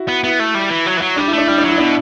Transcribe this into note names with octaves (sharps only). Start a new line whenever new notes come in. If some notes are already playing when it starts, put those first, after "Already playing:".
Already playing: E4 F#4
B3
B3 E4
A3
G3
E3
F#3
E3
F#3
G3 D4
E4
A3
D4
G3 E4
D4
F#3 E4
B2 D4